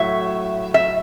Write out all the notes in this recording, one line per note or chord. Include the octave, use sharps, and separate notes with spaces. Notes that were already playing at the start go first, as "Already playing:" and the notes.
Already playing: A2 F#3 E5
E5